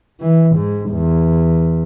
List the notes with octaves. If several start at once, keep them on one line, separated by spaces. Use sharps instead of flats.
E3
G#2
E2